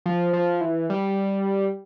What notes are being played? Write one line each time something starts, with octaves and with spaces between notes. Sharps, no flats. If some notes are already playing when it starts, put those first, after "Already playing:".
F3
F3
E3
G3